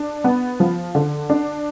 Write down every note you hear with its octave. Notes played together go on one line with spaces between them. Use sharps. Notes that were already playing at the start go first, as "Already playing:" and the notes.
Already playing: D4
B3
F3
D3
D4